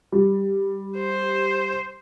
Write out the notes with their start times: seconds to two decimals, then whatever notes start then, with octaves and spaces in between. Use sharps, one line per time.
0.12 G3
0.98 C5